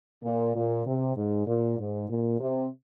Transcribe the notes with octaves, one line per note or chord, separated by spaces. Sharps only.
A#2
A#2
C3
G#2
A#2
G#2
A#2
C3